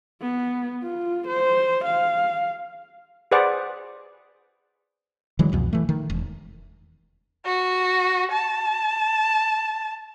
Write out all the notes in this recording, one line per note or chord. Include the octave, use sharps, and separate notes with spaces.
B3
F4
C5
F5
G#4 B4 C5 D5 F#5
D3 E3 F#3 G#3
C2 F2 B2
E3 A3
D#3
E1
F#4
A5